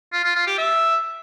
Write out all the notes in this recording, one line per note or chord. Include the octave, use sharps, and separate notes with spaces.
F4
F4
F4
G4
E5